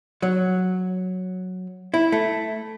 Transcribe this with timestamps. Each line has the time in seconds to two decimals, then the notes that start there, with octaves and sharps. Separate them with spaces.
0.22 F#3
1.94 E4
2.12 A3